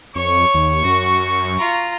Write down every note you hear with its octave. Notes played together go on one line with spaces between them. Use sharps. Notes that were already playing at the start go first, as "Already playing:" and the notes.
F2 C#5 C#6
D#2
F#2 F#4
F4 A#5